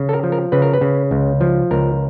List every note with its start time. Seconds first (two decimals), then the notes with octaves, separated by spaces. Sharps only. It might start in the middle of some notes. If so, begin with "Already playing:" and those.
Already playing: C#3
0.09 A4
0.13 A#4
0.23 F3
0.32 A#4
0.52 C#3 B4
0.62 A#4
0.73 B4
0.81 C#3
1.11 C#2
1.41 F3
1.71 C#2 A#4